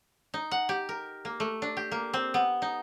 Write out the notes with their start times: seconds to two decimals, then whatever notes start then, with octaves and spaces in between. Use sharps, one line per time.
0.34 D#4
0.51 F#5
0.69 G4
0.89 A#4
1.25 A#3
1.40 A3
1.62 D4
1.77 G4
1.91 A#3
2.14 C4
2.34 B3
2.62 D#4